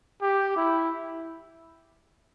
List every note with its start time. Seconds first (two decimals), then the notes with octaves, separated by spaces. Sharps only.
0.22 G4
0.56 E4